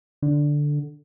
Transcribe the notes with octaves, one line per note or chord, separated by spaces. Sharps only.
D3